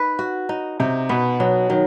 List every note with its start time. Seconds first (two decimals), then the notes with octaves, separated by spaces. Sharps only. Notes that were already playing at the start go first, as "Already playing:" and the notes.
Already playing: D#4 B4
0.19 F#4
0.49 D#4
0.80 C3 D#4
1.09 B2 B3
1.40 B2 F#3
1.70 D#3 F#3